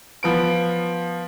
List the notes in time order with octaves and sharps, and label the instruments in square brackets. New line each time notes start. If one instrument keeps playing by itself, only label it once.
[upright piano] F3 B3 D7